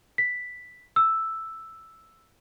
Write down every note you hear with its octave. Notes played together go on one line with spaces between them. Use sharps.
B6
E6